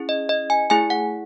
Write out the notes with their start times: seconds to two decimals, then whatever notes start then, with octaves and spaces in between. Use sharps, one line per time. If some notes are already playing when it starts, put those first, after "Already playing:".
Already playing: C#4 E4 G#4
0.09 D#5
0.29 D#5
0.50 G#5
0.70 A3 E4 G#4 G#5
0.90 F#5